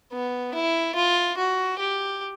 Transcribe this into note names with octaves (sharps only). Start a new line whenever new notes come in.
B3
E4
F4
F#4
G4